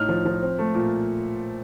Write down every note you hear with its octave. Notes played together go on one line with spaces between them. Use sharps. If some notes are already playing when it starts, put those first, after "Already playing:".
Already playing: A2 D#4 F6
F3
F3
C4
A3
A#2